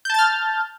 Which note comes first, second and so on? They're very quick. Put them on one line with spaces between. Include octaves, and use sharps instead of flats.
G6 A5 A6 F6